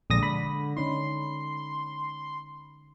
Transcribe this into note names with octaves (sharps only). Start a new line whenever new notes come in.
A#1 D3 G#3 D5 D#6 A#6
B5
D3 C#4 D#4 C6